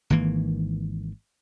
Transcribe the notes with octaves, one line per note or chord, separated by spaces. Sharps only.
G#1 D#3 E3 A#3